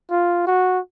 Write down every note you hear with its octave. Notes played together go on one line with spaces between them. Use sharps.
F4
F#4